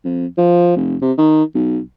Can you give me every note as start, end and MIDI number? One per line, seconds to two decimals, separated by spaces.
0.05 0.26 41
0.37 0.75 53
0.76 0.96 29
1.02 1.12 48
1.18 1.43 51
1.55 1.79 35